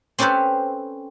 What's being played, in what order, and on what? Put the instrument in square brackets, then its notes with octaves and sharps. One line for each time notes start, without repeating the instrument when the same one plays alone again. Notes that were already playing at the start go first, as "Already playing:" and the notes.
[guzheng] C4 C#4 G4 A4 B4 C5